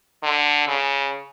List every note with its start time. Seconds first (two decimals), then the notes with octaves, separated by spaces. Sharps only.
0.23 D3
0.68 C#3